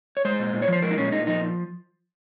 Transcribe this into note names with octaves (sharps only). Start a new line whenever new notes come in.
C#5
G#3 C5
A#2
A#2
C#5
F3 C5
G#3 A#4
D#4
A#2 C#4
A#2 D#4
F3 D#4